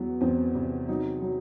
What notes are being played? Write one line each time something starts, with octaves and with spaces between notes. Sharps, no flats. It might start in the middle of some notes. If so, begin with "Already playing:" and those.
Already playing: E2 F#3 B3
E2 C4
C3
F#3 D#4
F#3